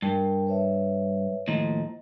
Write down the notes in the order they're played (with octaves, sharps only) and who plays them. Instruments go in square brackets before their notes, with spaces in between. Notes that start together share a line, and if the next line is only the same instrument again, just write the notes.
[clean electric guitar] G2 [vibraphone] A#4 G5 A5
[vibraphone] B4 C#5 E5
[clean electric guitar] D#2 A2 F3 [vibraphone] D#5 A#5